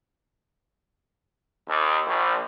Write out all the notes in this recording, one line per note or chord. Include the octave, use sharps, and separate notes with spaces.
D#2
A#1